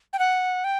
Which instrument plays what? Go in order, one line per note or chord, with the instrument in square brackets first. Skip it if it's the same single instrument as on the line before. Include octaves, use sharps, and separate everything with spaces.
[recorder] G5
F#5
G5